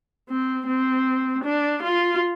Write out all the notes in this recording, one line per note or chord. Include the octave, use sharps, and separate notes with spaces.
C4
C4
D4
F4